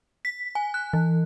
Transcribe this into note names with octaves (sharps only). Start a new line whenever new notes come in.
B6
G#5
F#6
E3